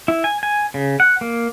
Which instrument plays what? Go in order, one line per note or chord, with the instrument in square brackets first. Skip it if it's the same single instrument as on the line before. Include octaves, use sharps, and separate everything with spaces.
[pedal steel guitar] E4
G#5
G#5
C#3
F#5
A#3